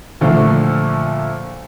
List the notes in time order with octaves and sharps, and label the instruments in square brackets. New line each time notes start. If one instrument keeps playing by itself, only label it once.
[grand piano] A#2 D3 F3 A3